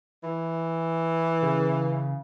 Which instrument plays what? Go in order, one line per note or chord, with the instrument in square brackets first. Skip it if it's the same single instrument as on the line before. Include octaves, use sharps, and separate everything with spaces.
[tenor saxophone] E3
[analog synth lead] C#3